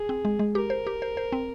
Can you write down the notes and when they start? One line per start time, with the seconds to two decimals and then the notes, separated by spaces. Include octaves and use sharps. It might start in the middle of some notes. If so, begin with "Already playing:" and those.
Already playing: G#4
0.09 C4
0.25 G#3
0.39 G#3
0.55 G4 A#4
0.70 C5
0.87 G4
1.02 C5
1.17 C5
1.32 C4